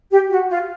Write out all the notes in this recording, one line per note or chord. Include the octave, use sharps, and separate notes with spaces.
G4
F#4
F4